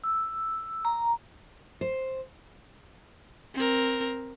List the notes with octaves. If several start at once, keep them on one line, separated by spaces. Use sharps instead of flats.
E6
A#5
C5
C4 A#4